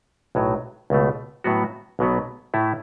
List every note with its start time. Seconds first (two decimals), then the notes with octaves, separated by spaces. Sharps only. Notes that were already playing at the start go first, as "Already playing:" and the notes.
0.35 B1 A2 F#3
0.90 C#2 B2 A3
1.44 A2 F#3 B3 F#4
1.99 B1 B2 F#3 B3
2.54 A2 A3 E4